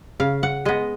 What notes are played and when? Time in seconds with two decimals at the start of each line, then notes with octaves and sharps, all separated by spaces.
0.20 C#3 F5
0.43 F#5
0.65 G#3 B3 D#5